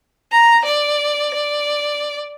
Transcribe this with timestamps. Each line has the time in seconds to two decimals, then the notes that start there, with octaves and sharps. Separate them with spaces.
0.32 A#5
0.65 D5
1.34 D5